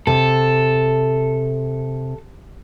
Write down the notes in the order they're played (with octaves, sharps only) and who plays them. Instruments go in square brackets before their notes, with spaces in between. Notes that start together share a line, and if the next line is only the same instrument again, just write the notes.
[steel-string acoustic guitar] C3 [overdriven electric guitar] A4